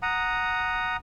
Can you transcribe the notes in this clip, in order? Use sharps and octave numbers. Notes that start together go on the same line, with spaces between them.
F#5 A#5 D#6